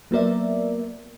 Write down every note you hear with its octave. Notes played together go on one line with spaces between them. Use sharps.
F#3 A#3 B3 A#4 D5 E5